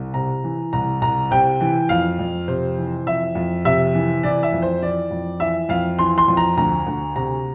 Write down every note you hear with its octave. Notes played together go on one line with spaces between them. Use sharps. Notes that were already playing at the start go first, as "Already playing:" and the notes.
Already playing: C2
C3 A#5
E3
C2 A#5
C2 A#5
C3 G5
E3
F2 F5
F2
C3 C5
E3
F2 E5
F2
C3 E5
E3
E3 D5
E5
F2
C5
E3 D5
F2
E3 E5
F2 F5
E3 C6
C6
F2
A#5
D2 A#5
D2
C3 A#5